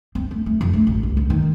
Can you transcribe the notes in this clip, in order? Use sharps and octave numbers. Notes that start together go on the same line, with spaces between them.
C4
A3
A3
F2
A3
A1
C#2
D2
D#3